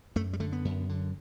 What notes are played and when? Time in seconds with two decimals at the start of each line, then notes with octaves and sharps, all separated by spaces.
0.16 F#2 A3
0.33 G3
0.40 D3 A3
0.52 B3
0.65 F#2
0.89 D3